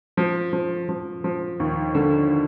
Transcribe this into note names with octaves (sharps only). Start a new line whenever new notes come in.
F3
F3
F3
F3
D#2
D3